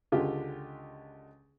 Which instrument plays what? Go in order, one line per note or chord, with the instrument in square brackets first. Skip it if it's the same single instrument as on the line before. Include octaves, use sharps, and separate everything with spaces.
[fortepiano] C#2 D3 G#3 F4 G4